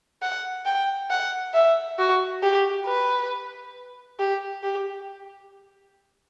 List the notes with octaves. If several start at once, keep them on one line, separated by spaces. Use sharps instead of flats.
F#5
G5
F#5
E5
F#4
G4
B4
G4
G4